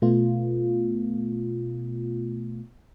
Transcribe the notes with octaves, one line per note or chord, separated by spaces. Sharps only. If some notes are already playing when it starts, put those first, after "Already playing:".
B2 A3 B3 F4